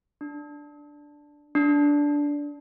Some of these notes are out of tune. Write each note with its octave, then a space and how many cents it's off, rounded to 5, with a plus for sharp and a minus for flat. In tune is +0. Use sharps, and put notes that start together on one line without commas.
D4 +0
D4 -10